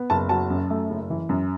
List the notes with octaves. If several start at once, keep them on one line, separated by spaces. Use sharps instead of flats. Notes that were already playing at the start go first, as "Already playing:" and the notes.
Already playing: B3
F#1 A5
F#3 A5
F#2
A3
F#1
E3
F#2